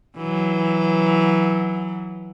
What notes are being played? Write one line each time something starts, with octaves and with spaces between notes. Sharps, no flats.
E3 F#3